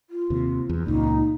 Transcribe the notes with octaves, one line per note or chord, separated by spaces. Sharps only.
F4
D#2 C3
E2
C#2 A#2 D#4